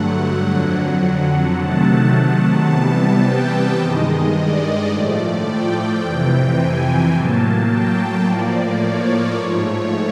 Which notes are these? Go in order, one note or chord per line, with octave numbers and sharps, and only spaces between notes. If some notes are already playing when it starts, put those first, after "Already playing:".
Already playing: G2 D3 F#3 A3 F#5
F2 D3 F#3
C3 D#3 F#3 A3 A5
A5
C3 E3 G3 B3 A5
G5
G2 D#3 G#3 D#5
D5
A2 F3 A3
G5
F2 C3 E3
G#5
A2 F#3 A#3 A5
G5
A2 F3 A#3 D5
C#5
G#2 F3 A3 C#5